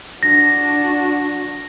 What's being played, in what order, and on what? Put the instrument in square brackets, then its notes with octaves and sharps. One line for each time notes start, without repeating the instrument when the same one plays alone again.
[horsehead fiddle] D4 F#4 [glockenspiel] A#6